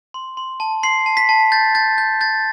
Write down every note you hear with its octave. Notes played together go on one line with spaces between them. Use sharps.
C6
C6
A5
C6 C7
A5
B6
A5
G6 A6
G6 A6
G6
G6 A6